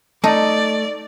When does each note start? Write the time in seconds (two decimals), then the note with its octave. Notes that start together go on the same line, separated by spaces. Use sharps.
0.24 A3 D#4 D5 A5